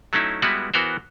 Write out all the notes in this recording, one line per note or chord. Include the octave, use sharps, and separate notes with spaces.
F#3 A3 C#4 D#4 E4
G3 G#3 B3 E4 F#4 B4
E3 B3 F#4 A#4 C5